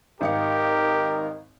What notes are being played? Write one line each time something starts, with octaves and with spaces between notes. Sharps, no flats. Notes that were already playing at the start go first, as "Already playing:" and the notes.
G#1 D#3 G4 A#4 F5 C#7